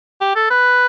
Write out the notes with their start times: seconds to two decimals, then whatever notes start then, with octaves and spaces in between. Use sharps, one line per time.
0.21 G4
0.35 A4
0.50 B4